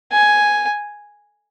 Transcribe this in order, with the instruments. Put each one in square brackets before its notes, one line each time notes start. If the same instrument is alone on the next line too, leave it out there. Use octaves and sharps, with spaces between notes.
[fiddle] G#5